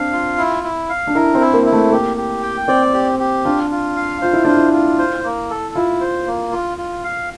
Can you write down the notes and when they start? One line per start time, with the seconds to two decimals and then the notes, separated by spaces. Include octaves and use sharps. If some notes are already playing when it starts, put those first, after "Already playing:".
Already playing: C4 D4 F5
0.13 F4
0.38 E4
0.64 E4
0.89 F5
1.07 D4
1.15 E4 A#4
1.35 C4
1.41 E4
1.53 A#3
1.66 E4
1.72 A3
1.92 A#3 G4
2.17 G4
2.42 G5
2.68 C4 D5
2.94 G4
3.19 G4
3.45 D4 F4
3.71 F4
3.96 F5
4.22 F4 C5
4.33 E4
4.45 D4 F4
4.57 E4
4.73 F4
4.99 C5
5.24 A#3
5.50 A4
5.75 E4 F4
6.01 C5
6.27 A#3
6.52 F4
6.78 F4
7.04 F5